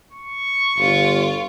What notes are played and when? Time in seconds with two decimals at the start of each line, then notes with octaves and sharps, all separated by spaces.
0.12 C#6
0.79 G1 F4